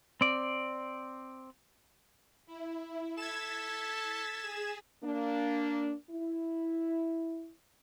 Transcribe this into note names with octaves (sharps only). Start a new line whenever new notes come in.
C4 D5
E4
A4 G#6 A6 B6 E7
G#4
A#3 D4
E4